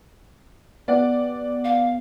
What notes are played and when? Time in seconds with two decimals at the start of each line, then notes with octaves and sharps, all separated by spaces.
0.88 B3 G4 D5 F#5
1.64 F5